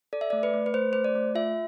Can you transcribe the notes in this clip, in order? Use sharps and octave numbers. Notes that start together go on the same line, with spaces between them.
A4 D5
E5
A3 D5
B4
A3
B4
A3 C5
A3 C5
D5
A3
F4 E5